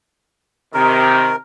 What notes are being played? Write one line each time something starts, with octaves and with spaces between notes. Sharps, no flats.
C3 D#3 A#4